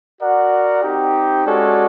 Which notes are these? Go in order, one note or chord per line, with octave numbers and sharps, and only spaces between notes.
F#4 A#4 D5 F#5
C4 D#4 G4
G#3 C#4 F#4 A4 D5